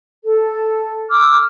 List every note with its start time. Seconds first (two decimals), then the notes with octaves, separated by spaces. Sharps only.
0.24 A4
1.10 D6 E6 F6